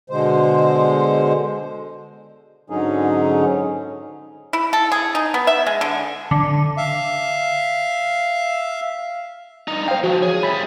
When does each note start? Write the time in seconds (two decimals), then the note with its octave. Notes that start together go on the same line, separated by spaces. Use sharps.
0.10 B2 D3 G#3 C5
2.70 G#2 D3 F#3 C#4 D#4 G#4
4.53 E4
4.73 A4
4.92 G#4
5.15 D#4
5.34 B3
5.47 E5
5.67 G#3
5.81 D3
6.31 D3
6.77 E5 F5
9.68 G2 D#4
9.88 B1 C5 F5 G5
10.04 F3 F#4
10.22 G#4 C#5
10.43 G3 E5 B5